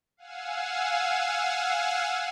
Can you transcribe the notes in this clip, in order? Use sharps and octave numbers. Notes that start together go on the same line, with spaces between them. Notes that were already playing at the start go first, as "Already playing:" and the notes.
F5 F#5 G#5 E6